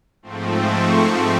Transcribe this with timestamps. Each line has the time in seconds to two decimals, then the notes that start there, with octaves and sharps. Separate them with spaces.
0.22 G#2 F3 A3 C4
0.72 C#6